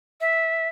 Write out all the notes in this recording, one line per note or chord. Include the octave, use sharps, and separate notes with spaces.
E5